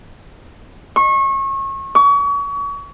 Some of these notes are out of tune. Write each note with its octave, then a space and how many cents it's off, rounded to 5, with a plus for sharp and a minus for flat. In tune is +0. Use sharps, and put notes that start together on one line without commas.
C#6 -30
C#6 +35